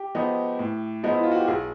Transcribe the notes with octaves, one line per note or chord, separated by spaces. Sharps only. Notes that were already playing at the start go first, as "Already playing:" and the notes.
Already playing: G4
F3 G#3 B3 D#4
A2
F3 G#3 B3 D#4
E4
F4
F#4
G4
B1 G#4